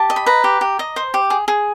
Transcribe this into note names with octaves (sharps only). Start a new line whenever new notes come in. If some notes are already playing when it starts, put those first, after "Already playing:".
Already playing: G4 A5
D#5
B5
B4 A#5
G4
G4
D#5
C5
G4
G#4
G#4